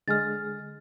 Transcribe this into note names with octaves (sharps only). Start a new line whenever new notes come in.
D3 G#3 G#4 F6 A6